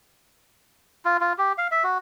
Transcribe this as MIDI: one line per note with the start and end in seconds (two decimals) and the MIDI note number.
1.05 1.17 65
1.21 1.33 65
1.38 1.52 67
1.58 1.68 77
1.71 1.84 76
1.84 1.98 66